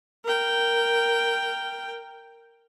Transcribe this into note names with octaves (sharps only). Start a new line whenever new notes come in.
A#4 G5